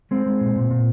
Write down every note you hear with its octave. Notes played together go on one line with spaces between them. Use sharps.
G#3 C4
G#3
A#2
A#2
A#2